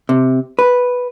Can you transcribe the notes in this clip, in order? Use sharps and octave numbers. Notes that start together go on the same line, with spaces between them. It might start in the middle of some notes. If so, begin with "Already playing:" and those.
C3
B4